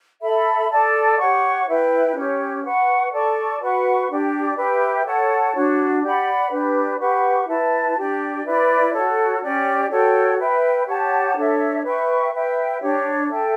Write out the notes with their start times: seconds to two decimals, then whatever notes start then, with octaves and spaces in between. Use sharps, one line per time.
0.21 A4 E5 B5
0.70 A4 D5 A5
1.18 G4 C#5 F#5 C#6
1.67 E4 B4 E5 G5
2.15 C#4 G4 C#5
2.63 B4 F#5 C#6
3.12 A4 D5 A5 C#6
3.60 F#4 B4 F#5 C#6
4.09 D4 G4 D5
4.57 G4 B4 E5 G5
5.05 A4 C#5 F#5 A5
5.54 D4 F#4 C#5
6.03 G4 D5 F#5 B5
6.51 D4 G4 B4
6.99 G4 B4 F#5 C#6
7.47 E4 B4 E5 A5
7.96 D4 G4 D5 G5
8.44 E4 B4 D5
8.93 F#4 A4 C#5
9.41 C#4 G4 D5
9.90 F#4 A4 C#5 G5
10.38 B4 E5 G5
10.87 G4 C#5 F#5 A5
11.36 D4 A4 C#5 E5
11.83 B4 E5 G5 C#6
12.32 B4 E5 G5
12.80 D4 G4 C#5
13.29 A4 E5 G5